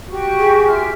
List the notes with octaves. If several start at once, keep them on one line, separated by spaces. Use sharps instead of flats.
F#4 G4 C#6
G#4
F4 E5 F6
G4